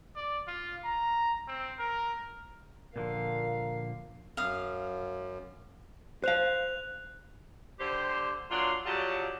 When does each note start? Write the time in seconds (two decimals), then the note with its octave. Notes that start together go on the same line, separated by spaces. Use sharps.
0.16 D5
0.47 F4
0.84 A#5
1.48 C4
1.78 A#4
2.96 A#2 D3 F3 A#4 F5
4.37 F#2 F5 D#6
6.24 C5 F5 F#6 F7
7.80 D3 G3 G4 C5
8.50 A#2 F#3 D4 F4 C6
8.85 C#3 F#3 G3 F4 F#4 A5